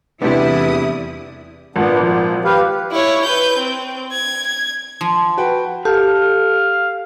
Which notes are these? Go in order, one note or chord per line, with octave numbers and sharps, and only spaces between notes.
E2 C3 G3 A3 B3 D4 E4 D#6
G#1 A#2 B3 D4
F3
G4 B4 F5
E4 C#5
B4 G6
C4
G#6
G#6
F3
F#4 B4 G5
G4 A4 F5